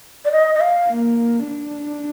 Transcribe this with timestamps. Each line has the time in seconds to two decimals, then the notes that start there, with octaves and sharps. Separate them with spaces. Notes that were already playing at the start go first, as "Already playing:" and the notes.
0.25 D5
0.32 D#5
0.55 D#5
0.61 F5
0.89 A#3
1.47 D4